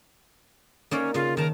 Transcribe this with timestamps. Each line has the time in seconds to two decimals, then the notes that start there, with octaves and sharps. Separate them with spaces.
0.91 A#3 C#4 D#4 D5
1.14 C#3 F4 D#5 F5
1.37 D#3 A#4 A5